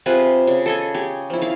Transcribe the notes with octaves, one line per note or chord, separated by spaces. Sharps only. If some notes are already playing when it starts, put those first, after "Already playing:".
C3 F4 G#4 B4
C#3
A4 D#5 G#5
G4 G#4
F3 E4
E4 F5